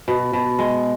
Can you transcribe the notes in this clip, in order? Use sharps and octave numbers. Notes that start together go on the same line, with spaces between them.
B2
B2
G#3